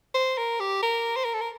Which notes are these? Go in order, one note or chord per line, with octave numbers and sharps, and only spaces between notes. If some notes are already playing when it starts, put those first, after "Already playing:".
C5
A#4
G4
A#4
C5
A#4
A4
A#4